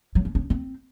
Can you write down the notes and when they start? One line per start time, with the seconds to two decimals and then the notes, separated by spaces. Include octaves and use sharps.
0.15 F#3
0.25 C#4
0.35 C#4
0.50 C4